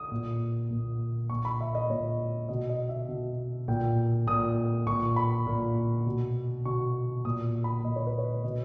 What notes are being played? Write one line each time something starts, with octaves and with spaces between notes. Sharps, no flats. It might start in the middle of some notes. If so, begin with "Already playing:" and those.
Already playing: D#6
A#2
A#2
A#2 C#6
B5
E5
D#5
A#2 C#5
B2 D#5
D#5
E5
B2
A#2 G5
A#2 D#6
A#2 C#6
B5
A#2
B2
B2 C#6
A#2 D#6
B5
A#2 D#5
C#5
B4
C#5
B2 D#5